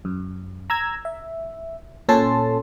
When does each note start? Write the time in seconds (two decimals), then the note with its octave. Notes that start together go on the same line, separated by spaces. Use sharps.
0.05 F#2
0.70 A#5 E6 G#6
1.05 E5
2.09 A#2 C#4 A4 A5 C6